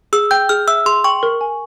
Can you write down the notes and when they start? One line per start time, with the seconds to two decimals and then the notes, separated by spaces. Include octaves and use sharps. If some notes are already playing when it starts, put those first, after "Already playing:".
0.13 G#4 E6
0.31 G5 G6
0.49 G#4 F6
0.68 E5 E6
0.86 G#4 C6
1.04 G5 C#6
1.23 A#4
1.41 G#5